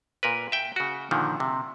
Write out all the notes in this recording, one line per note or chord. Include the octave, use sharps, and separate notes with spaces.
A#2 A#4 B4
E5 G5
C#3 F#4
A#2 D3 D#3 F3
C3